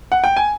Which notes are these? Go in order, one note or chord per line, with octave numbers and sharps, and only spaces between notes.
F#5
G5
G#5